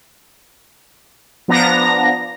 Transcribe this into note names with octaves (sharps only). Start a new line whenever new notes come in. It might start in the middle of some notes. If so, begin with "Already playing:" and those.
F3 B3 D4 A#5 A#6